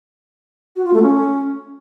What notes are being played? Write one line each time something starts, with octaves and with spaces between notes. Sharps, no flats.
F#4
F4
A3
C#4